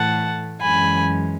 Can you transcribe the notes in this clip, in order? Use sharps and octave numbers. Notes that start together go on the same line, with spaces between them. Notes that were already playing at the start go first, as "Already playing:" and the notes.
Already playing: A2 E3 A3 F#5 A5
F#2 E3 G#3 C#4 G#5 B5